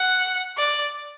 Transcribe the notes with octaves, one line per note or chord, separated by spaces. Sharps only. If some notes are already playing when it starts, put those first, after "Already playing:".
Already playing: F#5
D5